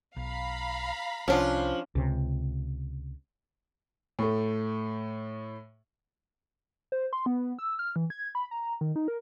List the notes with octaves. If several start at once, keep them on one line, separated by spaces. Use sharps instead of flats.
B1 F5 A#5 B5
C2 F3 C#4 D4 F4
C#2 C3
A2 A3
C5
C6
B3
E6
F6
E3
G#6
B5
A#5
D#3
D#4
A#4